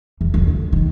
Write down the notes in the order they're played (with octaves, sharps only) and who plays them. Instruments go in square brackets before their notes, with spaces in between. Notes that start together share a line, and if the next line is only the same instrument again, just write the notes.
[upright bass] E2
D3
F2
D#3